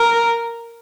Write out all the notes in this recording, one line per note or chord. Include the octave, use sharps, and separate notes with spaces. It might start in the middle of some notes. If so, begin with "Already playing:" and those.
Already playing: A#4